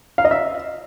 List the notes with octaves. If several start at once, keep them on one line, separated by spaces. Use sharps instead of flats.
F5
D#5
E5